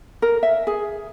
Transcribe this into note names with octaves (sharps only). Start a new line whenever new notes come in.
A#4
E5
G#4